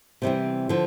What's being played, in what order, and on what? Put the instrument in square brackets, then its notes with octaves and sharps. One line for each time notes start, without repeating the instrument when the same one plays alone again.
[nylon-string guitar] C3 E3 G3 C4
D3 F3